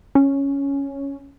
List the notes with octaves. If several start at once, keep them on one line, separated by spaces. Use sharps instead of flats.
C#4